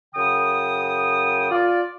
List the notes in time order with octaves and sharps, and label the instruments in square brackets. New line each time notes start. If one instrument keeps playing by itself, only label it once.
[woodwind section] F#2 C#3 G5 D#6
F4 D5